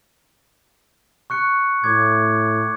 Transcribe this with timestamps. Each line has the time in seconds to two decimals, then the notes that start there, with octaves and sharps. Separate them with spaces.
1.30 C#6 F#6 C#7
1.84 A2 C#6 D6 G#6